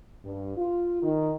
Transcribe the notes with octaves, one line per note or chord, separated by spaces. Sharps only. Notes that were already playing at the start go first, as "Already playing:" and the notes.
G2
F4
D#3